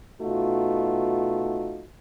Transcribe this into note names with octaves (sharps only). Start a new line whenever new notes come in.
B2 A3 D#4 F4 F#4